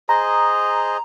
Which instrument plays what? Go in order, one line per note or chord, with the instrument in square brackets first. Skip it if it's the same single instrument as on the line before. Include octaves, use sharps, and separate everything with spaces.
[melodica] G#4 C5 D#5 [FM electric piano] A#5